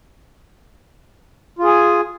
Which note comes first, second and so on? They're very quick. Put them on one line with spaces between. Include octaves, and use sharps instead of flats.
F4 G#4 G#5